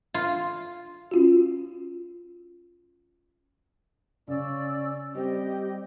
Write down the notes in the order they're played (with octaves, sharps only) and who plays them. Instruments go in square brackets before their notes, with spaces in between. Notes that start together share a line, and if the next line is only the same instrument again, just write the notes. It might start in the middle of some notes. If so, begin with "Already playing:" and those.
[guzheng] F4
[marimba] C#4 F4 F#4
[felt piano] C#3 [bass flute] C#4 [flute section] D5 E6
[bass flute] G3 [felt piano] C4 [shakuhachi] G4 [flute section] D#5